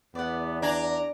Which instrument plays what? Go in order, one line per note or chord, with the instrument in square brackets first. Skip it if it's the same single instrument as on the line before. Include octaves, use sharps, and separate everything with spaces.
[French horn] E2 [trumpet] B3 [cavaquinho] D5 F#5
[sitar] D4 [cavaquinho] G#5 D6 [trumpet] A#5